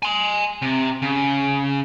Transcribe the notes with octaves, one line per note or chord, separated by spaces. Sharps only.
G#5 C6
C3
C#3